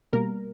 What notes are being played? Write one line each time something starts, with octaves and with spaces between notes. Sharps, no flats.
B2 G3 A#3 A#4